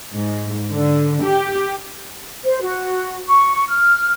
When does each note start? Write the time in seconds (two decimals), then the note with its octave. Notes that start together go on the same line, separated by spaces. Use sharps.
0.13 G#2
0.73 D3
1.25 G4
2.45 C5
2.61 F#4
3.28 C#6
3.68 F6